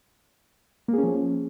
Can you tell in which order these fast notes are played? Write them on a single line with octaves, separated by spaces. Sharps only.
A#3 G#4 C#4 F3